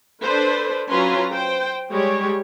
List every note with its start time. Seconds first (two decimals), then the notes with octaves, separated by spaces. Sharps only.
0.23 D4 A4 B4 C5
0.88 F#3 C#4 F4 B4 A#5 C6
1.32 C5 G5
1.91 G3 G#3 G4 C#5